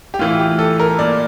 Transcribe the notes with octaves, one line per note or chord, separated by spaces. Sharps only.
G4
A2 E3 F4
G4
A4
A#4
A#2 D5